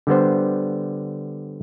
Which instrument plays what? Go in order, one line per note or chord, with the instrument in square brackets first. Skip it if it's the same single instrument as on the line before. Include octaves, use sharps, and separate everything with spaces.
[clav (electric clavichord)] D3 G3 B3 C5